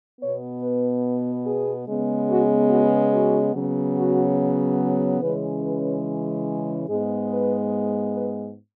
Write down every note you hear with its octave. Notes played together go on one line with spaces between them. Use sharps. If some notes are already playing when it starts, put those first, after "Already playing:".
B2 B3 C#5
B4
G#4
C#3 G#3 B3
F#4
F#4
F#4
C#3 F#3 B3
F#4
G#4
C#3 E3 G#3 C#4 B4
B4
G#2 G#3 B3 G#4
B4
B4